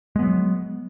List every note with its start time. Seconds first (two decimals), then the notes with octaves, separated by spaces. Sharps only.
0.16 G#3
0.19 B3
0.22 F#3